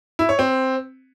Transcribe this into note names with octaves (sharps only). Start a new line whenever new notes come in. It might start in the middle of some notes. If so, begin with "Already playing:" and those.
E4
C#5
C4